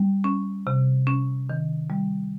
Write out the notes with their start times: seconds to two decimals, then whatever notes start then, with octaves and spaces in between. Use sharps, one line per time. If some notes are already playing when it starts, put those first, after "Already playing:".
Already playing: G3
0.24 C#4
0.67 C3
1.07 C#4
1.49 D#3
1.90 G3